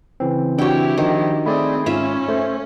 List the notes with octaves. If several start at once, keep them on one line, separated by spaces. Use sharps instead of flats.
C#3 E3 C4
D4 E4 F#4 G4 C#5 G5
D#3 F3
A3 C4 G#4 D5 B5
G#2 C#4 F4 E5
A3 C5